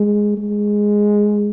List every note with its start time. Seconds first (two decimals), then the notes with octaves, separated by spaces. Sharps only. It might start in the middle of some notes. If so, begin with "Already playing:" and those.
Already playing: G#3
0.37 G#3